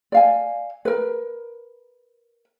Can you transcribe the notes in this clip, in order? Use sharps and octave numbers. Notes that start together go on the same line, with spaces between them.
D5 F5 G#5
A#4 B4